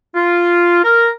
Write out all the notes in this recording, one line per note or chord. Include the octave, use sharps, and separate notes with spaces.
F4
A#4